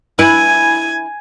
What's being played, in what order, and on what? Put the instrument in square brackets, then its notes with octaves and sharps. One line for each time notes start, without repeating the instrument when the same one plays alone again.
[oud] E4 B4 [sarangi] G#5